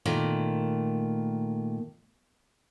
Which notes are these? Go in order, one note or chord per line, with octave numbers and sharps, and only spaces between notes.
A#2 D#3 A3